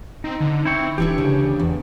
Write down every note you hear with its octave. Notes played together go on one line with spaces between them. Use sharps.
C4 D#4
D3
C4 E4 G5 C#6
D1 E3 D4 E4 G4 C#5
D2 C#3
E2